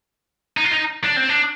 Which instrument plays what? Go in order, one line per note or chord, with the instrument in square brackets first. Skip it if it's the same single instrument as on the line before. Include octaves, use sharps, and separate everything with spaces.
[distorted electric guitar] D#4
F4
D#4
D4
C4
D4